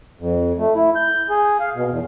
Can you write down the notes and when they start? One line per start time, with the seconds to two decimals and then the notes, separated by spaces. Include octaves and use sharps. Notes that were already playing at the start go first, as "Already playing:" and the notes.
0.20 F2
0.58 A3
0.75 E4
0.96 G6
1.30 G#4
1.60 F5
1.75 B2
1.91 E2